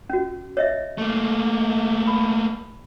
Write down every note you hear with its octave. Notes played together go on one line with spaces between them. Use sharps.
C#4 F#4
C#5 D#5 E5
A3 A#3
B5